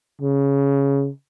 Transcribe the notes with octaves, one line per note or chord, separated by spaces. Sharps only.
C#3